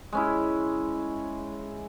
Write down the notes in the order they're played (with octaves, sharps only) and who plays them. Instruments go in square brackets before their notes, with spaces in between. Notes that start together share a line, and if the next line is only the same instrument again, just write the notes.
[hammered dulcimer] G#3 C#4 E4